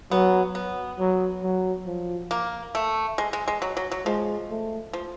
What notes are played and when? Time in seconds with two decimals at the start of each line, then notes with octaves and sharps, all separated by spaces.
0.11 F#3 B3
0.55 B3
0.99 F#3
1.43 F#3
1.87 F3
2.31 A#3
2.75 A3
3.18 G#3
3.33 G#3
3.48 G#3
3.62 F#3
3.77 F#3
3.91 F#3
4.06 F3 G#3
4.50 A3
4.93 F3